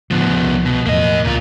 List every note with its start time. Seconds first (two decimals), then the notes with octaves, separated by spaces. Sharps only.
0.11 A2 D3 F3 B3
0.27 D#1 C#3
0.42 C2
0.65 B2
0.86 E2 A2 F3 A#3 D#5
1.25 C#2 A#2 F4